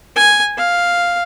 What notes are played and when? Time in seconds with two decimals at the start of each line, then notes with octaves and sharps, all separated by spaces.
0.16 G#5
0.58 F5